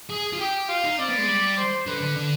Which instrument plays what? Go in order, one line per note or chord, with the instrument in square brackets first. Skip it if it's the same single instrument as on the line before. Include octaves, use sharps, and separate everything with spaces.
[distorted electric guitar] G#4 [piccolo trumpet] D#6
[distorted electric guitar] F4
[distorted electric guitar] G4 [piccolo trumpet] G5
[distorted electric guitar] F4 [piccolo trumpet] F5
[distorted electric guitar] D#4
[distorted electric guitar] C4 [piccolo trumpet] D5
[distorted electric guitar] B3
G#3
G3
[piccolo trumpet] C5
[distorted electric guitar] D3 [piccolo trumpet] B4
[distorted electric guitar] D3
D3